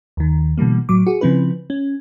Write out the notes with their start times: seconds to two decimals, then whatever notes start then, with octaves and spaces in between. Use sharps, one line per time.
0.17 D#2 D#3
0.58 B2 D3 E3 G3 A#3
0.89 A2 F#3 D6
1.07 F#4 G#4
1.21 C#3 F3 C4 E4 B4
1.70 C#4